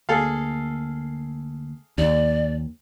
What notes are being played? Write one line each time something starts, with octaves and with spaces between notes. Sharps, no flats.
D2 A#3 G#4 A4 F5
D#2 D5